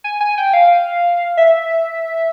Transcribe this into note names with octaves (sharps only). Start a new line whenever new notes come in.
G#5
G#5
G5
F5
E5